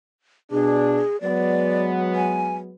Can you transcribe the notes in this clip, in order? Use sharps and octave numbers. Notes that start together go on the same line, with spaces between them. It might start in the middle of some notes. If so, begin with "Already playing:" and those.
B2 D4 G#4
F#3 G#3 B3 D5
G#5